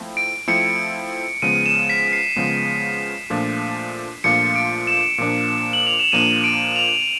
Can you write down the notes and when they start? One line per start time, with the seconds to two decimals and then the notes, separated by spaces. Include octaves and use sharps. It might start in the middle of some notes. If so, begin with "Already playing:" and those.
Already playing: F3 A3 C4 E4
0.17 D7
0.48 F3 A3 C4 E4 C#7
1.42 C#3 F3 G#3 B3 D#7
1.66 E7
1.90 B6
2.13 C7
2.36 C#3 F3 G#3 B3
3.30 A#2 F3 A3 D4 F4
4.24 A#2 F3 A3 D4 F4 C#7
4.56 D7
4.87 E7
5.18 A#2 F3 A#3 D4
5.73 F#7
5.87 F7
5.99 E7
6.12 A#2 F3 A#3 D4 D#7
6.44 D7
6.76 F7